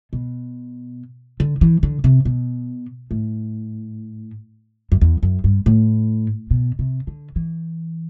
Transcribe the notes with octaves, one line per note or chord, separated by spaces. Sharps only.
B2
D3
E3
D3
C3
B2
A2
F#2
E2
F#2
G2
A2
B2
C3
D3
E3